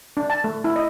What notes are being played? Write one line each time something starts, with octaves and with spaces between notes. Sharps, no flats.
D4
A5
A3
E4
D#5